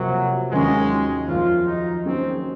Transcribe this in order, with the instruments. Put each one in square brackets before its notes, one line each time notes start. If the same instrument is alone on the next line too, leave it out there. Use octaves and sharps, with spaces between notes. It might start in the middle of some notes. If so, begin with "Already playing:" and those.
Already playing: [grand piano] C3 F3 A#3 F4 [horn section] F#3
[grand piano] D#2 D#3 F#3 C#4 F#4 [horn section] G#3
[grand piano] F2 D#3 F#3 [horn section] F4
[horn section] D#4
[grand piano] D#3 F#3 A#3 C#4 G#4 [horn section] C4